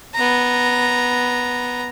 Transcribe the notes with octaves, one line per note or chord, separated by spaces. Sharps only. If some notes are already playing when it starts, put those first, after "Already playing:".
B3 A#5